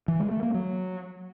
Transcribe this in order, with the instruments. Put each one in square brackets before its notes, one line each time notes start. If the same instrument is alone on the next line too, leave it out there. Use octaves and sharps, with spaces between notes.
[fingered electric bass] E3
G#3
A3
A#3
F#3